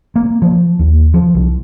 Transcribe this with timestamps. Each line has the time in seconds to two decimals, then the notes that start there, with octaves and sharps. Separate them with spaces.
0.16 A#3
0.42 F3
0.79 D#2
1.14 F3
1.35 C2